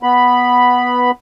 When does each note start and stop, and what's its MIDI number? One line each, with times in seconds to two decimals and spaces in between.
0.03 1.11 59
0.03 1.11 83